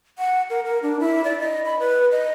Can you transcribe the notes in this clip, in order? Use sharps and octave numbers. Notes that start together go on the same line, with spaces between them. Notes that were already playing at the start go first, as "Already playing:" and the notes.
F#5
A#4
A#4
D4
E4
D5
D#5
B5
B4
D#5